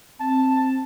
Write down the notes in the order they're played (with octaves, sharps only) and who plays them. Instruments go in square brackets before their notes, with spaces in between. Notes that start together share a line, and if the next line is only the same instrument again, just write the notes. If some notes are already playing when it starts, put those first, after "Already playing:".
[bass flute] C4 [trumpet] A5